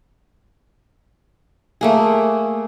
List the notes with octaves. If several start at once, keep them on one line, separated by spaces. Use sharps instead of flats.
A3 A#3 G#4